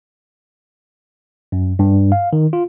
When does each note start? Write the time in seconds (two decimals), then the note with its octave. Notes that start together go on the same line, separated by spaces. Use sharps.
1.52 F#2
1.79 G2
2.12 F5
2.33 D#3
2.53 F4